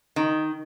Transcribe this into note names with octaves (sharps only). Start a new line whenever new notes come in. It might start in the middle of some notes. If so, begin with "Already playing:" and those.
D#3